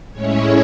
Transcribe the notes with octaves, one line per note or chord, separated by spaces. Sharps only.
A2 G#3 C#4 E4 C#5